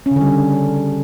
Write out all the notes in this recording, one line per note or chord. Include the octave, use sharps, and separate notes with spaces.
C#4
C#3
D3
G3